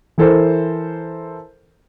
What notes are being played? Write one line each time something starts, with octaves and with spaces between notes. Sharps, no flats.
E3 E4 A4 A#4 C5